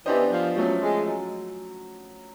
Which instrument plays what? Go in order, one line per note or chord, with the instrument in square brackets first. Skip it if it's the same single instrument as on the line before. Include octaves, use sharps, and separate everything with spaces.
[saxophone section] E3 [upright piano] B3 D4 G4 C5 D#5
[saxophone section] F3
[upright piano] F3 A3 C#4 [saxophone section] F#3
[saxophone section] G#3
[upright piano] F#3